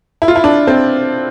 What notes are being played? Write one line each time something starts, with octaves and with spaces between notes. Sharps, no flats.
E4
F4
E4
D4
C4